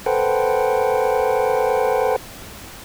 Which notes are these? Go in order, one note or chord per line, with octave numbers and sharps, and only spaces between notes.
A4 B4 C5 F#5 G5